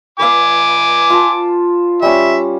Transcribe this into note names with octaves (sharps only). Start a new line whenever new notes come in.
B4 D5 F5 G#5 D6
F4 A5
G3 C#4 E5